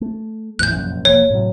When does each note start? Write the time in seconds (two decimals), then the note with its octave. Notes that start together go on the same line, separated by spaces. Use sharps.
0.01 A3
0.59 E2 A2 E3 F#6 G6
0.71 F1 A#1 F#2
1.05 E1 F3 A#3 C#5
1.30 A2 C3 F#3